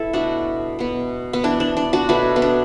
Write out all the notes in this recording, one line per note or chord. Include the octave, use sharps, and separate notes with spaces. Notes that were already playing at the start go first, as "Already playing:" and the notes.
Already playing: B3 E4 A4
B2 A3 D4 F#4
B2 B3
B3
E3 B3 D4
D4
D4
D4 F#4
B2 F#3 A3 F#4 B4
B3
D4